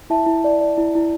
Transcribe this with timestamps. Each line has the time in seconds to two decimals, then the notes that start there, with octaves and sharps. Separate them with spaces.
0.10 E4 E5 A5
0.26 E4
0.44 D5
0.61 D5
0.78 E4
0.95 E4